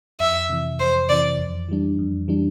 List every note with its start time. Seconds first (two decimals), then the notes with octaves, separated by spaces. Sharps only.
0.20 F2 E5
0.50 C3 E3
0.80 F2 C5
1.09 C3 E3 D5
1.39 F2
1.69 E3 G3 D4
1.99 F2
2.28 E3 G3 D4